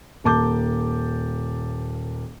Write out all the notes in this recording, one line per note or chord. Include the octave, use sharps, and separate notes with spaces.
D#1 A#3 A5 D6 G6